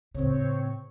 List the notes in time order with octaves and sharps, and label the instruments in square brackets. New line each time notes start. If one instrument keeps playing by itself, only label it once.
[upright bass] A2 C#3 [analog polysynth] C4 C#5